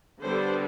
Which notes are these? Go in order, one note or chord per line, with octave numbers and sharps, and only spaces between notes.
D3 G3 B3 D4 A4 C5